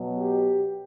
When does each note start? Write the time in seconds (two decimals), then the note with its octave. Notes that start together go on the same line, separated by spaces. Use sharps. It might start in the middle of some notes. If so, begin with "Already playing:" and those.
Already playing: B2 F#3
0.19 G4